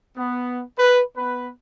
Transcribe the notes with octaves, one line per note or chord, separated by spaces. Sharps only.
B3
B4
B3 B4